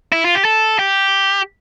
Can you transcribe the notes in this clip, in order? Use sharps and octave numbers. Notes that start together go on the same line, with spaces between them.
E4
F4
G4
A4
G4